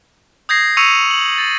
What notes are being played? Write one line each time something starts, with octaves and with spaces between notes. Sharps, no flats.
D#6 G6 G#6 A#6 C7
C#6 E6 C#7 D#7 F7
F#7
A6